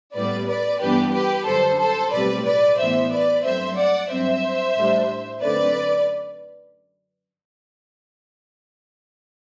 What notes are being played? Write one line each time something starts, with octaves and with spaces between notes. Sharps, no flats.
A2 G3 B3 B4 D5
B4 D5
G2 E3 B3 D4 G4 B4
G4 B4
F#2 D3 G3 A4 C5
A4 C5
B1 A2 G3 C4 B4 D5
B4 D5
A1 A2 E3 B3 C5 E5
B4 D5
G2 F#3 A3 C4 C5 E5
D5 F#5
G2 F#3 C4 C5 E5
A1 A2 G3 D4
F#2 D3 A3 C4 B4 D5